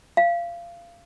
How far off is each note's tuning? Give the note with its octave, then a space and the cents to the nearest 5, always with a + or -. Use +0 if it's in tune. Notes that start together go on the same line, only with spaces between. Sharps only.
F5 -20